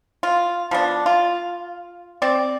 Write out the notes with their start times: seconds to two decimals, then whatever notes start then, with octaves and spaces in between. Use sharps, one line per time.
0.23 F4
0.71 F3 B3 D4
1.06 F4
2.22 C4 D5